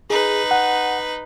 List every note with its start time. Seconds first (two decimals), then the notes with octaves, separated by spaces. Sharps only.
0.10 D#4 G#4 B4
0.51 F#5